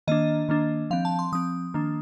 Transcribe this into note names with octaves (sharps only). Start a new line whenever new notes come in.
D#3 A#3 D4 D#5
D#3 A#3 D4
F3 C4 F5
A5
C6
F3 C4 D#6
D#3 A#3 D4